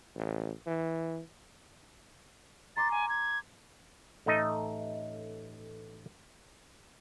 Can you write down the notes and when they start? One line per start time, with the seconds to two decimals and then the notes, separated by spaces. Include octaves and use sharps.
0.15 A1
0.67 E3
2.76 A#5 C6 D6 A6
2.91 G#5
3.09 G#6
4.26 A1 A3 D#4 D#5